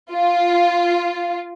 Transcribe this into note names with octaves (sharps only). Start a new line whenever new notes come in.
F4